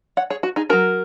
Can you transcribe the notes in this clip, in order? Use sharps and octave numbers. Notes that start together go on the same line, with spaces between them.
C#5 F#5
G#4 C#5
F#4
D#4 G#4
F#3 C#4 F#4 A#4